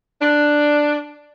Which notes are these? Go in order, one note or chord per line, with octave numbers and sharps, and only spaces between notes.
D4